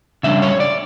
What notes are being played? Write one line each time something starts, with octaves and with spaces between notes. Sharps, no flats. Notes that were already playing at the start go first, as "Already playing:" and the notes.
C#3 G3 D4 E5
C#5
D5